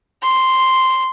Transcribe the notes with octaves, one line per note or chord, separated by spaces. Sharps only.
C6